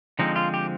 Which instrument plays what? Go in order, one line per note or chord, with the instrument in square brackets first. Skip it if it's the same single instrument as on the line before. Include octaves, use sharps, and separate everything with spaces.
[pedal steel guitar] D3 F3 G#3 C4 D#4
F4
G4